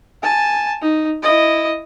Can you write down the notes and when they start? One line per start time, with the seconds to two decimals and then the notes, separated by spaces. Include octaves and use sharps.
0.23 G#5 A5
0.82 D#4
1.23 E4 D#5